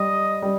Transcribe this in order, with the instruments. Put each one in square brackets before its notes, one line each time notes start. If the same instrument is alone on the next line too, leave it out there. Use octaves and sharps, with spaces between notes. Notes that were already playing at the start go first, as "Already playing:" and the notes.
Already playing: [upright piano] G3 [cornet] D#5
[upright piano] G3